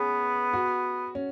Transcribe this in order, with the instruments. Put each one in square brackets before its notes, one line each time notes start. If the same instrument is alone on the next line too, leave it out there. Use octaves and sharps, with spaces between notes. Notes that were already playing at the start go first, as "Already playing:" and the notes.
Already playing: [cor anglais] B3 [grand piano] C#4 G#4 B4
[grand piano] F#4
C#4